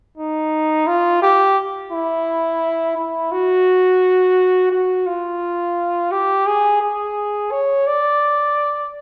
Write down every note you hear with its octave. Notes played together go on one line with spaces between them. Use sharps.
D#4
F4
G4
E4
E4
F#4
F#4
F4
G4
G#4
G#4
C#5
D5